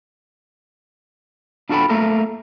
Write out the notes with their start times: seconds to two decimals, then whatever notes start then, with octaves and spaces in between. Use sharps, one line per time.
1.69 D4 F4 F#4 A4 G5 B5
1.89 A3 A#3 F4 A4 A#4